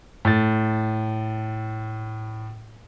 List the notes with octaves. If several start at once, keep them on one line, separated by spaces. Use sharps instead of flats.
A2 A6